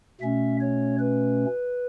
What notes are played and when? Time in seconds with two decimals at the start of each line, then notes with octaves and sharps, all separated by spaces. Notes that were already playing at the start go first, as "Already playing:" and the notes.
0.21 B2 A3 C#4 E5
0.61 C#5
0.99 B4